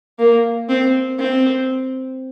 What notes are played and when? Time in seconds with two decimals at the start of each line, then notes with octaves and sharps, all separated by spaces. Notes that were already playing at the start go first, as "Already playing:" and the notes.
0.19 A#3
0.69 C4
1.19 C4